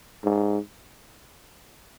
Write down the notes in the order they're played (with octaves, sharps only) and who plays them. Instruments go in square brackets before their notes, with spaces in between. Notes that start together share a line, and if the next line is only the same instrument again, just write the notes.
[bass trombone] G#2